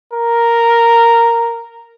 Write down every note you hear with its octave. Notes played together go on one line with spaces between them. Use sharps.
A#4